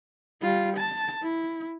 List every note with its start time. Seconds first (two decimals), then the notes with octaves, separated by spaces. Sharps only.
0.42 G3 F4
0.77 A5
1.23 E4